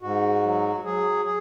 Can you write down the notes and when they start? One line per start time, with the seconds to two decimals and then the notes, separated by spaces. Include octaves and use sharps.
0.02 G#2 F#4
0.43 F#3
0.85 F#3 G#4
1.25 G#4